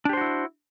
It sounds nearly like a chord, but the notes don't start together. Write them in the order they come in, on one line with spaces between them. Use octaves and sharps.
D4 G4 C5 F#4 E4